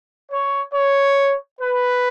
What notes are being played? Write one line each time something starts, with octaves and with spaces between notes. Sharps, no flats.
C#5
C#5
B4